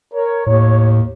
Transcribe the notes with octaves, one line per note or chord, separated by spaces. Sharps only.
A#4 C#5
D#2 A2 C#5